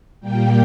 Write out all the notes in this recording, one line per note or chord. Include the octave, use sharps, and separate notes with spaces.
A#2 G3 A#3 G5